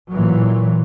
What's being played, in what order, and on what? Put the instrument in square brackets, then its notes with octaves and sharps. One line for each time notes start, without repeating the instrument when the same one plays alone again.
[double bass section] A#2 E3 F#3